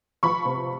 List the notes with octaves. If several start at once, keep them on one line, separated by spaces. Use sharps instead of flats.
F3 B5 C#6
C3